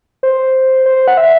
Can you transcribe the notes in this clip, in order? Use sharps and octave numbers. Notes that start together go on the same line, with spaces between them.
C5
C5
F#5
E5